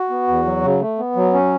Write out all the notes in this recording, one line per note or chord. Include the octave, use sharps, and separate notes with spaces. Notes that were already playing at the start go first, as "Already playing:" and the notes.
Already playing: F#4
B3
E2
F#3
C#3
A3
B3
F#3
C#4